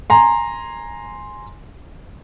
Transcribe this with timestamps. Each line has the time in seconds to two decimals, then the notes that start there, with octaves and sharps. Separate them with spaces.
0.10 G#5 A#5 C6